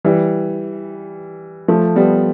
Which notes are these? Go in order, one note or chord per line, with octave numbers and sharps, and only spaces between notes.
E3 G3
F3 A3
G3 B3